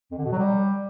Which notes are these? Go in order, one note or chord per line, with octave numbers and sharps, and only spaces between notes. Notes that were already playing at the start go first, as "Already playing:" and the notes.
F2
D3
B2
F#3
G3